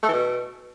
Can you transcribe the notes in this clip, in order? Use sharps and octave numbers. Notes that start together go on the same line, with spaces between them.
A3
E3
B2